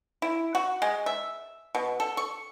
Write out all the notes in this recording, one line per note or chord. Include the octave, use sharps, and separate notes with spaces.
E4
F#4
G#3
E5
B2
A4
C#6